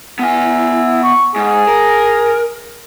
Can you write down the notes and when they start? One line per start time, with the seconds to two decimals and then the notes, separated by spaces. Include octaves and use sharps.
0.19 B3 E4 G#5
1.03 C#6
1.36 G#2 G#4
1.68 A#4